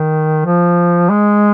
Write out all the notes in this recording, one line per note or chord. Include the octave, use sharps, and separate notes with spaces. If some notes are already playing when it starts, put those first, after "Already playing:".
Already playing: D#3
F3
G#3